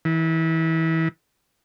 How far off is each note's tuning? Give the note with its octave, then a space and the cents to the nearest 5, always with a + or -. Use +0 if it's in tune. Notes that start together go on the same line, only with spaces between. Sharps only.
E3 -25